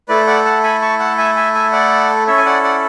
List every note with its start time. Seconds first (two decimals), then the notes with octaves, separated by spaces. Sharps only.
0.08 A3 E4 A4 B4 D5
0.27 D5 F#5
0.45 F#5 A5
0.63 G#5 B5
0.81 A5 C#6
0.99 F#5 A5
1.18 E5 G#5
1.36 E5 G#5
1.54 E5 G#5
1.72 D5 F#5
2.27 C#4 E4 A4 C#5 E5
2.37 G#5
2.46 D5 F#5
2.63 D5 F#5